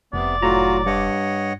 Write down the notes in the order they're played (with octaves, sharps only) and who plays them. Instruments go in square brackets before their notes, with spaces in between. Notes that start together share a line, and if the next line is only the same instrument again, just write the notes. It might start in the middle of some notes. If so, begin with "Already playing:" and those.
[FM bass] F1 [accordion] C3 B3 [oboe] D5
[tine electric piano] A2 F#3 A#5 [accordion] F4 F#4
[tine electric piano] G2 [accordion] C#5 D#5 F#5